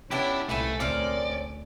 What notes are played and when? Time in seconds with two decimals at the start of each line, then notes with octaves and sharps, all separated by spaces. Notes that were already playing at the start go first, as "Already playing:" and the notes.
0.11 B3 C#4 D4 E4 G4
0.49 C2 A#2 A3 E4 B4 G#5
0.80 D2 C4 C#4 A#4 D5